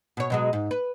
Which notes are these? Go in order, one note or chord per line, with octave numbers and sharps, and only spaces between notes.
B2 C#5
B2 F#3 G#3
G#2
B4